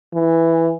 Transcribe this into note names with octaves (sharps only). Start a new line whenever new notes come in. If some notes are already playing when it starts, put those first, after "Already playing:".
E3